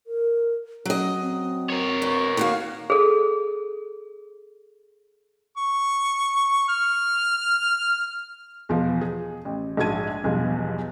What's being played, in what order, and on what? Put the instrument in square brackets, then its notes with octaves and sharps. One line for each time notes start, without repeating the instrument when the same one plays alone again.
[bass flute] A#4
[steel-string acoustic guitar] F#3 D#5 [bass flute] C#4
[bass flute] C4
[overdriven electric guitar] A#4 C#5
[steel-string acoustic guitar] B2
D#2 F#4 F5
[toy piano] G#4 A4
[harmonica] C#6
F6
[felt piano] E2 B2 F3
G#4
A1
A#1 G#2 F#4 A5 G#6 D#7
B1 E2 G2 B2 F3